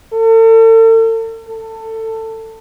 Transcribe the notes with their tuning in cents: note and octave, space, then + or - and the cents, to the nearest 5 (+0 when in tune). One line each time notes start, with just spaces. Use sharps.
A4 +40
A4 +20